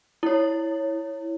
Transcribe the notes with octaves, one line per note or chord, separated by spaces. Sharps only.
E4 C#5